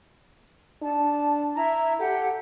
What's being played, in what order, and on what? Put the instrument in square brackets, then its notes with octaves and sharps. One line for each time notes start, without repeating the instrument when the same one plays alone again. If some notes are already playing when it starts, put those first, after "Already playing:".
[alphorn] D4 [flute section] A5
[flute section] E4 E5 A#5
[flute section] G4 F#5 [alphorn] A4